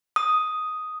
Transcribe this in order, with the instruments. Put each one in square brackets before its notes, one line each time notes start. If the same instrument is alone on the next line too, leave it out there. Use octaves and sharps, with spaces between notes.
[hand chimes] D#6